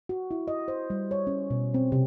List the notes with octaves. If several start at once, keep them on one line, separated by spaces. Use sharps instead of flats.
F#4
E4
D#5
C5
G3
C#5
C#4
B2
C4
C3